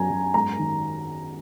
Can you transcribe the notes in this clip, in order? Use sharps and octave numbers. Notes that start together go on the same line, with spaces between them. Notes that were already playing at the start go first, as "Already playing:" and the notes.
Already playing: F#2 F#3 G#5 A#5
F#2
G#2 A#5
D#3